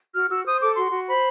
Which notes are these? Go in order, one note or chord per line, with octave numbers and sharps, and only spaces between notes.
F#4 F6
F#4 E6
C5 D#6
A4 D6
F#4 C6
F#4
C5 B5